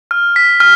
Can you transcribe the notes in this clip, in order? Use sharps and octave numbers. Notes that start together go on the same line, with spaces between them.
F6
B6
F6